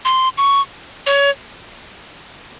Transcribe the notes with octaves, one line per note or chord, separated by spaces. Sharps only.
C6
C#6
C#5